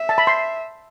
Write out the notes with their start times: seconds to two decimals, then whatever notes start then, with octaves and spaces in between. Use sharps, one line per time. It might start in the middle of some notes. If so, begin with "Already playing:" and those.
Already playing: E5
0.09 A5
0.18 B5
0.27 C6